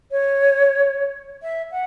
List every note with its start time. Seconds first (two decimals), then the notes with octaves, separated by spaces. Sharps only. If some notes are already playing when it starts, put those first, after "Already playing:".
0.11 C#5
1.42 E5
1.71 F#5